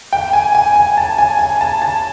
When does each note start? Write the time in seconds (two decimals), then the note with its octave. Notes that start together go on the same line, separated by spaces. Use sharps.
0.13 G5
0.33 G#5
0.55 G#5
0.76 G#5
0.97 A5
1.18 G#5
1.39 G#5
1.61 A5
1.82 A5